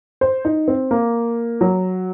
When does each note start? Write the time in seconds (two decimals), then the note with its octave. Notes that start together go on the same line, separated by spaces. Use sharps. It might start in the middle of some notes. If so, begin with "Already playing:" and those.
0.21 C5
0.45 D#4
0.68 C4
0.91 A#3
1.61 F#3